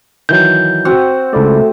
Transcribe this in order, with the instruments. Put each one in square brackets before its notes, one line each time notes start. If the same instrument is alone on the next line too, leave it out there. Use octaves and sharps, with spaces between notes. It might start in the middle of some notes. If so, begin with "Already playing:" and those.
[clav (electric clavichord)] D#3 E3 F#3 [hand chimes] G6
[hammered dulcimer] C4 F#4 F#5
[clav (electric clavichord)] C#2 E4 D5 [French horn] A3